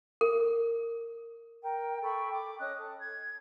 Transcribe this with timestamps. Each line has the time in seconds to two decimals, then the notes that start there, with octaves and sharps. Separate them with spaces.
0.21 A#4
1.62 A#4 G5
2.02 A4 G5 B5 C#6
2.31 D6
2.58 C#4 D#5 D#6 F#6
2.77 A4
3.00 G#6